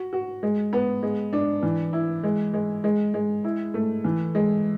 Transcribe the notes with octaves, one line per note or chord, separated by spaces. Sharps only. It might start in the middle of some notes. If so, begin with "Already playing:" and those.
Already playing: F#4
F#4
G#3
B3
G#3
D4
E3
E4
G#3
G#3
G#3
G#3
E4
A3
E3
G#3